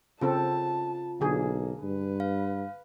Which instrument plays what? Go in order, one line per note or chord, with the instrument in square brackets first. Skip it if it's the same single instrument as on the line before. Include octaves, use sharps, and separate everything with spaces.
[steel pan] C#3 C4 A4 [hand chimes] F4 [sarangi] A5
[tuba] B1 [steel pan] D3 G#4 [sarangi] A#3
[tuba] G2 [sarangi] B4
[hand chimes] F5